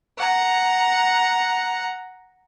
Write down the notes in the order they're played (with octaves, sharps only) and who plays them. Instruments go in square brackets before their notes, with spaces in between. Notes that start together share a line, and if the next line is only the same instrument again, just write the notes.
[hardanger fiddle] F#5 A#5